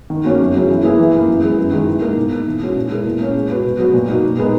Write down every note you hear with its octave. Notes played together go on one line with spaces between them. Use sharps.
D#3
A#3 C#4 F#4 C#5
F#2
C#3 F#3 C#4 E4
E3
A#3 E4 G#4 B4
E3
A#3 E4
F#2
E3 G#3 B3
F#2
D#3 G#3 B3 E4
G#2
D#3 A#3 D#4 A#4
B2
A#3 D#4
E3
G#3 C#4 F#4
A#2
G#3 B3 E4 A#4
A#2
A#3 C#4
G#3
B3 F#4 B4
B2
F#3 B3 F#4
A#2
A#3 D#4 F#4
A#2
G#3 B3 D#4 A#4